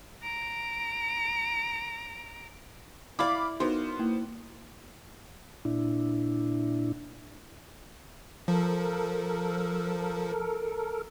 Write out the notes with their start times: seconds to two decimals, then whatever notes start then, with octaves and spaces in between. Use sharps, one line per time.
0.22 A#5 D7
3.19 E4 D5 F5 B5 D6
3.60 B3 D#4 F#4 A#4 C5 C6
3.99 A#3 E4
5.65 A#2 D4 E4
8.48 F3 A4 A#4